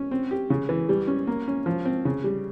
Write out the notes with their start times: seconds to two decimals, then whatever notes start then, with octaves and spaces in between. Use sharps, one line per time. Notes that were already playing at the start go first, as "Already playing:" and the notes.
Already playing: C#4
0.11 C4
0.31 G4
0.50 C#3
0.69 E3
0.89 G3
1.07 C#4
1.27 A#3
1.48 C#4
1.66 F3
1.85 C4
2.05 C#3
2.24 G3